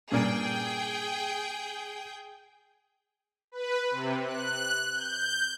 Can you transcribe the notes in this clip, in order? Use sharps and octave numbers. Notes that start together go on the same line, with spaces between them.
G2 A#2 G#4 G5 G6
B4
C3
F#6
G6